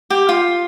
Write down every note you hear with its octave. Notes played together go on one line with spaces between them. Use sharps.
G4
F4